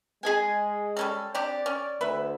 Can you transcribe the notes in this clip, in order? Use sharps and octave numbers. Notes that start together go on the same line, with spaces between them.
G#3 G#4 D#5 G#5
G3 C#4 A4
C4 D4 G4 D5
C#4
D2 B4 E5